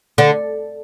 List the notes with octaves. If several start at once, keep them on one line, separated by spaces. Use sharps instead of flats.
D3